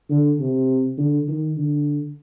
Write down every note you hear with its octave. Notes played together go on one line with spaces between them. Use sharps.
D3
C3
D3
D#3
D3